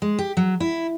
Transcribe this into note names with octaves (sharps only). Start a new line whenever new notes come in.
G#3
G4
F#3
E4